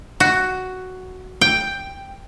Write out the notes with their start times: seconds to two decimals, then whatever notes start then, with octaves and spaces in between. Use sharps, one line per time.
0.20 F#4
1.41 G5